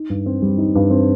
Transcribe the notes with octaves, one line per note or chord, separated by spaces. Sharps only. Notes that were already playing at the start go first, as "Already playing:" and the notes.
Already playing: D#4
G2
C4
G3
D#4
G2
C4